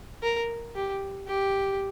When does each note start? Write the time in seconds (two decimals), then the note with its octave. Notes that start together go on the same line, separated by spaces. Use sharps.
0.23 A#4
0.75 G4
1.28 G4